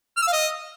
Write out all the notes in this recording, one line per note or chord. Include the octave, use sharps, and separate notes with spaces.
F6
E6
F5
D#5